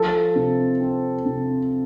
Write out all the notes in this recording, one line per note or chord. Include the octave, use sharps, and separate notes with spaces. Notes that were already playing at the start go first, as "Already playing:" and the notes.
Already playing: F3 A4
C3
C4
C3